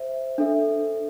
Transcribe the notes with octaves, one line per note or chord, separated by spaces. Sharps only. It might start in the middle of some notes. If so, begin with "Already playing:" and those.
Already playing: C5 E5
D4 A4 E5